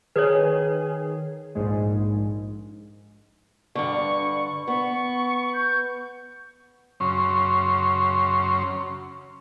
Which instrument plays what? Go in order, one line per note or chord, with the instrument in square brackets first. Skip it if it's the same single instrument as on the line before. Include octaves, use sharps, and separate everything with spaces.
[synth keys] D#3 G#4 [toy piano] B4 C#5
[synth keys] A#1 G#2 G#3
[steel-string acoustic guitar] G2 D3 [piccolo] C#6
[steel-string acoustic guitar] B3 [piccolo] C#6
[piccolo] G6
[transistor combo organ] F#2 C#3 C#4 C6